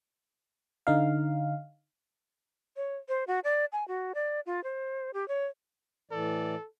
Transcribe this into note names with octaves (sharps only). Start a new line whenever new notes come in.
D3 D#4 F5
C#5
C5
F#4
D5
G#5
F#4
D5
F4
C5
G4
C#5
A2 E3 A4 D5